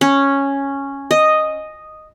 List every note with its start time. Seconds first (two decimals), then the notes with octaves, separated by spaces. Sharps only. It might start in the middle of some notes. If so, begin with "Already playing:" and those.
0.01 C#4
1.11 D#5